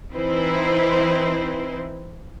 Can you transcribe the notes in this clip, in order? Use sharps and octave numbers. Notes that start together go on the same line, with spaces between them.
E3 C4 D#4 E4 B4 C5